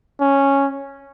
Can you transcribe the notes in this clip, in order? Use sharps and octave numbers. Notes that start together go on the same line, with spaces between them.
C#4